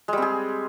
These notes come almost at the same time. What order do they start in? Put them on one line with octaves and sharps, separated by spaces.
G#3 G3 C4 G#4